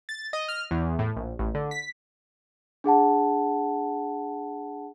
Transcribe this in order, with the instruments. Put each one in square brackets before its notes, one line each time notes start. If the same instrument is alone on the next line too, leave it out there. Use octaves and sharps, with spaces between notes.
[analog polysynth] A6
D#5
F6
E2
A2
A#1
A1
D3
B6
[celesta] D4 G#4 F#5 A5